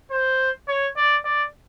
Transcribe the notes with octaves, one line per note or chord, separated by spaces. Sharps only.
C5
C#5
D5
D5